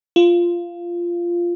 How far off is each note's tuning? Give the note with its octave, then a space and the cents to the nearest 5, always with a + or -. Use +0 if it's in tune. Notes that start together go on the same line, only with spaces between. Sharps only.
F4 -10